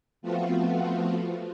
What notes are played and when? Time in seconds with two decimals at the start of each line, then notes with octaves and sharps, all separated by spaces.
0.22 F3 A3 B3 C4 F4 F#4